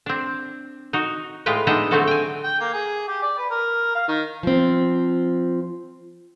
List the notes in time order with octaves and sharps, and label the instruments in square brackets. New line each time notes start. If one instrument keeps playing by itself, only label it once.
[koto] C4 D4
D#4 F#4
A2 G#3 F4 B4 G5
G#3 B3 D4 D#4 D#5 E5
D3 F#3 A3 C4 F#4 A4
G5 G#5
[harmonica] G5
A#3
G#4
G4
D5
B4
A#4
F5
D#3
[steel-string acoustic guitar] F3 C4